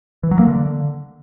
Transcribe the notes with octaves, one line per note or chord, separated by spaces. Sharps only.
E3
F#3
A#3
D3